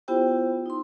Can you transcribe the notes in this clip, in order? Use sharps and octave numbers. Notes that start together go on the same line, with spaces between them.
B3 E4 F4 G4 C5 G5
D#4 C6